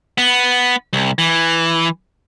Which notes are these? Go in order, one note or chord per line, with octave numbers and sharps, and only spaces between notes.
B3
C2
E3